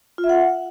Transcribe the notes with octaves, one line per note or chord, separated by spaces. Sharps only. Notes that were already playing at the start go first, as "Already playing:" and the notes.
F4
E5
F#5